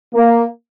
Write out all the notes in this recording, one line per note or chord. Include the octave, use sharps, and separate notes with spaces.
A#3